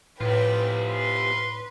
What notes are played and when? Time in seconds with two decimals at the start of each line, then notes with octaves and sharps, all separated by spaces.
0.21 A2 C3 F4 B4 G5
0.89 B4 C6